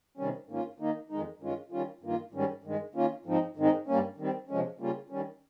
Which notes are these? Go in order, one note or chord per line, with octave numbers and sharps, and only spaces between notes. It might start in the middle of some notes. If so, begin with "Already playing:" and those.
C3 D#3 G3 C#4
G#2 D#3 A#3 C#4 F4
D#3 A#3 D#4
F2 D#3 G#3 D#4
G2 D#3 G#3 C#4 F4
D#3 G3 C#4 F4
G2 D#3 A#3 F4
G#2 D#3 G3 C#4
G2 D#3 G#3
D#3 A#3 C#4 F4
G#2 F3 C4 D#4
G#2 D#3 G#3 C4 D#4
G2 G3 A#3 C#4
D#3 G3 C4
C3 F3 G#3 C#4
C#3 G3 A#3 C#4 F4
D#3 G3 C#4